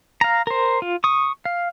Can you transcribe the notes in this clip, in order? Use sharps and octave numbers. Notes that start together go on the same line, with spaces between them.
F5 A#5
A#4 C5
F4
C#6 D#6
F5